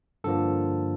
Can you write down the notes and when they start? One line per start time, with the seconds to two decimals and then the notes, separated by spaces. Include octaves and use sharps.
0.24 G2 D3 F3 A#3 A4